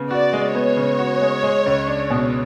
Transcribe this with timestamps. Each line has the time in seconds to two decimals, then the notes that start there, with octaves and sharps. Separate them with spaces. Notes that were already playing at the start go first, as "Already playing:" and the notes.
Already playing: C#3 B3
0.11 F#4 D5
0.33 G#3
0.54 B3 C#5
0.77 C#3
0.99 F#4
1.21 G#3
1.43 G#3
1.66 C#2
1.87 D4
2.10 B2